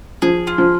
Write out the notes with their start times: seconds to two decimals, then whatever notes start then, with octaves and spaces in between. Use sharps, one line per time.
0.22 F3 G#4
0.47 F4
0.58 F3